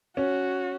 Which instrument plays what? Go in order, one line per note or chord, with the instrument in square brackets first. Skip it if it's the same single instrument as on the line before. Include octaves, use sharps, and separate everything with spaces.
[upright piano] C#4 [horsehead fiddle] F#4